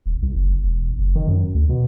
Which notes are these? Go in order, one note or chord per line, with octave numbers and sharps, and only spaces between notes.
D#1
C2
F#1
E1
F#1
D#3
F#2
D2
B2